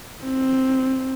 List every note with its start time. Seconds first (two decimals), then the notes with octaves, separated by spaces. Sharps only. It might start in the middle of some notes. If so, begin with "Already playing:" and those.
0.24 C4